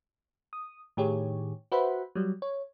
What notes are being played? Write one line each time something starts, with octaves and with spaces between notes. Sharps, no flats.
D#6
A2 D#3 G4 G#4 C#5
F#4 B4 C5 E5 F#5 B5
F#3 G3
C#5